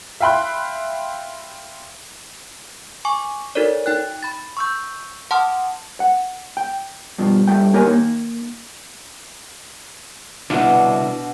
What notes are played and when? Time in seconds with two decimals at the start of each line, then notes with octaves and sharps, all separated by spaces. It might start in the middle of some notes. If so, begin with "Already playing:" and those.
0.20 E5 F5 G5 B5 C6 F#6
3.05 G#5 C#6 D6
3.55 D#4 F#4 A4 A#4 C#5 D5
3.86 D#4 G5 F#6
4.23 B5 A6
4.57 C#6 E6 G6
5.31 F#5 A5 C6 D6 D#6 F6
6.00 F#5
6.57 G5
7.18 G2 B2 F3
7.48 G2 A3 G5
7.73 A#3 G4 A#4 C#5 G#5
7.87 A#3 D#4
10.50 C2 B2 D3 D4 E4 F#4